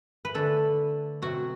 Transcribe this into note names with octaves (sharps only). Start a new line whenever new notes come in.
B4
D3 A3 D4 A4
B2 F#3 C4 F#4